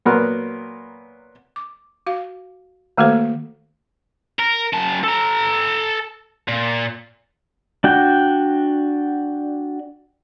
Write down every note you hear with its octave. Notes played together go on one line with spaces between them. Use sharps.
A#2 F#3 B3 A#4 B4
D6
F#4 F5
D#3 A3 A#3 F#4 A4 C5
A#4
F#2 A5
A4 A#5
A#2
D4 F#4 G5